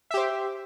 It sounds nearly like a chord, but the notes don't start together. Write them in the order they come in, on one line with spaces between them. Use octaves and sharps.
E5 G4 C5